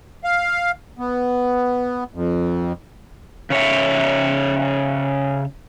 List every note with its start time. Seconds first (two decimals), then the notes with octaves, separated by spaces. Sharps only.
0.24 F5
0.99 B3
2.14 F2
3.50 C#3 C#5 E5